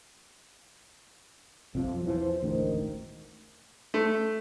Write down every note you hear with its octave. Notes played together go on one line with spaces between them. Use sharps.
B1 F2 C3 F3
E2 E3 F3 C5
E1 A1 D2 D#3
A3